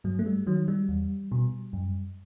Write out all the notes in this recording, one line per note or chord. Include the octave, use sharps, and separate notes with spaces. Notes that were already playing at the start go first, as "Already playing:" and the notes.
G2 F#3
A3
G3
D#3 F#3
G3
E2
B2
F#2